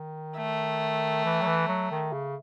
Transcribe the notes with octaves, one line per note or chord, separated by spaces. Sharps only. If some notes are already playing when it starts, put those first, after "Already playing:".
Already playing: D#3
A3
E3
F#3
E3
F#3
D#3
C#3